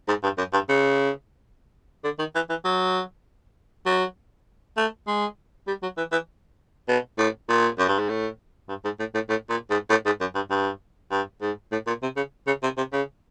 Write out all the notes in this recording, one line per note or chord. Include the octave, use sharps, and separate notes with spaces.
G#2
G2
F#2
G2
C#3
D3
D#3
E3
E3
F#3
F#3
A3
G#3
G3
F#3
E3
E3
B2
A2
A#2
F#2
G2
G#2
A2
G2
G#2
A2
A2
A2
A#2
G#2
A2
G#2
F#2
G2
G2
G2
G#2
A2
A#2
C3
C#3
C#3
C3
C3
C#3